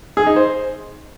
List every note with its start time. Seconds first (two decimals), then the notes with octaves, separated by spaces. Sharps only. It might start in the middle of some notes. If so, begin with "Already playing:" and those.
0.17 G#4
0.27 D#4
0.36 C5